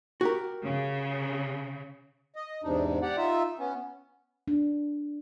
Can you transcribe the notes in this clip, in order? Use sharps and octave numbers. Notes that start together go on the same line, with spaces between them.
F#4 G4 A#4
C#3
D#5
E2 G#2 C3 D4 D#4
G4 D5 F#5
D#4 F4 E5
B3 C#4
D4